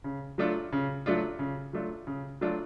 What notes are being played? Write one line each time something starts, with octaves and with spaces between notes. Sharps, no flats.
C#3
F#3 A3 D4 F4
C#3
F#3 A3 D4 F4
C#3
F#3 A3 D4 F4
C#3
F#3 A3 D4 F4